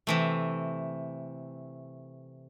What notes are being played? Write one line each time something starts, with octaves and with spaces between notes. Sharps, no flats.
C3 E3 A3